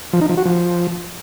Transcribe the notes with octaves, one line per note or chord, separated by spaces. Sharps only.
F3
D#4
F3
F#4
F3